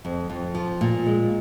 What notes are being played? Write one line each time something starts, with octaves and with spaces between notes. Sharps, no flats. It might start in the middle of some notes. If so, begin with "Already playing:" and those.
F2
F2
F3
A#2
G#3